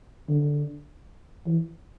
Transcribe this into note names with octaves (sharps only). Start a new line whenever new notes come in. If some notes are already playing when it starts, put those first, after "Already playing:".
D3
E3